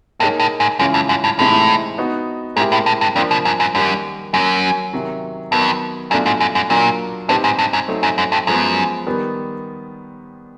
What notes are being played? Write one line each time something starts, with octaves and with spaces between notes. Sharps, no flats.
G2 A#3 D#4 G#4 C#5
A2
G#2
F#2 C#3 E3 G#3 C#4 F4
F2
F#2
G2
A2 C3 E3 G#3 C4 D#4
B3 D#4 F#4
G#2 G#3 C4 E4 G4 A#4
A2
A2
G2
F2 F3 A#3 D4
B2
F#2
F#2
F#2 D#3 G3 A#3
F#2 F#3 A#3 C#4
C3 D#3 F#3
F2 D#3 F#3 B3
F#2 B2 F#3 A3 D4 F4
G#2
F#2
F#2
A#2 F#3 A#3 D4 F4
A2 C4 D#4 G4 B4
G#2
G2
F#2
F#3 A3 C4 D#4
F#2
F#2
F2
F#2 F3 G#3 B3
D#3 G3 B3